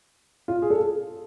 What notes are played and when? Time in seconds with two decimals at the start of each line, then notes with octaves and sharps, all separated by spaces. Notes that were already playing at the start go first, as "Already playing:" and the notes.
0.48 F4
0.62 G#4
0.70 A4